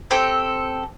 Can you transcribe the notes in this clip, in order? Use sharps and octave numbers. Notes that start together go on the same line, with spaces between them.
C4 G4 A4 G5